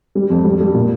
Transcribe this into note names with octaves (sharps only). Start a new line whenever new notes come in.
G3
F2
G3
G3
A#2